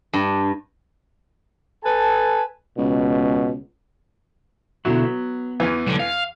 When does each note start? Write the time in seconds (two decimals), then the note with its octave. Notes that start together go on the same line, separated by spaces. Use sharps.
0.13 G2
1.84 A4 B4 G#5 A5
2.77 C#2 B2
4.85 B2 D3 F#3 E4
5.03 B3
5.60 E2 E3
5.86 B1 D3
5.99 F5